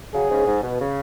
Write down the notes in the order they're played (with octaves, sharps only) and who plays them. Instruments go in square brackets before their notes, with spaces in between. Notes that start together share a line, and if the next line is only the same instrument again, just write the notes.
[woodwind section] C#3 F#3 [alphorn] G#4
[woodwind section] G#2 C#3
G#2
B2
C#3